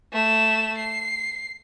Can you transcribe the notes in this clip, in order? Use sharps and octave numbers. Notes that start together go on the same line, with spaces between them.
A3 E7
C7